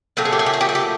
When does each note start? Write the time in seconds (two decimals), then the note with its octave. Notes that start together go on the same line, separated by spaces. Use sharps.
0.17 A#2 F#3 A3 G4
0.25 G#4
0.33 G4
0.39 G#4
0.46 G4
0.53 G#4
0.61 G4
0.69 G#4
0.75 G4